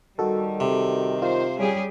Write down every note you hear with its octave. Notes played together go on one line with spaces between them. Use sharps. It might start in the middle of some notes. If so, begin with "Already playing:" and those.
D#3 G3 F#4 A4
C3
D#3 F4 C5
G3 C#4 G4 G#4